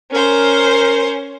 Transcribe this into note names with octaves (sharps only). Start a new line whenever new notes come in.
C#4 A#4 C5